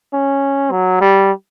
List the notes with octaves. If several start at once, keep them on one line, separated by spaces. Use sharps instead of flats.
C#4
F#3
G3